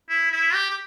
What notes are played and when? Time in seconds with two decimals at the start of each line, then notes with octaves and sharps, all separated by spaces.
0.10 E4
0.32 E4
0.54 G4
0.70 G4